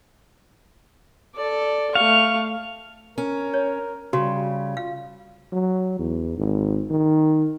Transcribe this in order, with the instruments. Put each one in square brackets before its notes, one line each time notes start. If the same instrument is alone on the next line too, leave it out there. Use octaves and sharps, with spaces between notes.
[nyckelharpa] A4 D5
[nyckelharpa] A3 C#6 [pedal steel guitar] F5
[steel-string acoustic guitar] C#4 [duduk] A#4
[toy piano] C#5
[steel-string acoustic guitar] C#3 [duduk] G3 [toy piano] F#4
[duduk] F4 [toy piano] F5
[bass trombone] F#3
E2
G#1
D#3